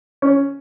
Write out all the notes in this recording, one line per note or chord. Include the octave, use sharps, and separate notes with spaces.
C#4